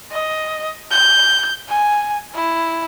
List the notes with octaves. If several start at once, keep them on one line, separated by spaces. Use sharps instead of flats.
D#5
G6
G#5
E4